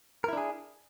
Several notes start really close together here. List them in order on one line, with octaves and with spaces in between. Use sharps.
A#4 E4 D4 G#4